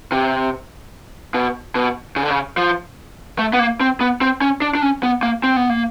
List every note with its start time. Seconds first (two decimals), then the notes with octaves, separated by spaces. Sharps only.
0.12 C3
1.34 B2
1.75 B2
2.16 C#3
2.23 D3
2.30 C#3
2.57 F3
3.39 A3
3.53 B3
3.59 A#3
3.81 C4
4.01 B3
4.21 C4
4.41 C#4
4.62 D4
4.75 D4
4.82 C#4
5.03 B3
5.23 A#3
5.43 C4
5.56 B3
5.69 A#3